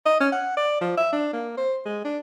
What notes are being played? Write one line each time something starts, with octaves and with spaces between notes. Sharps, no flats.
D#5
C#4
F#5
D5
F3
E5
D4
A#3
C5
G#3
D4